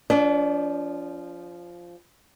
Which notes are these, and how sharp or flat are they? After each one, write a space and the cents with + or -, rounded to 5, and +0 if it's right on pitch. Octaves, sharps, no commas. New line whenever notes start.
F3 -5 D4 -45 D5 +30